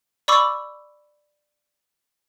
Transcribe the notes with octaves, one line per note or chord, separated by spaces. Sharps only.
D5 B5 C#6 D6 E6